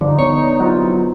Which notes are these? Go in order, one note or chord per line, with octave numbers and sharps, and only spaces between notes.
G2 D3 F3 D#4
D3 B3 C#5
C3 F#3 E4 F4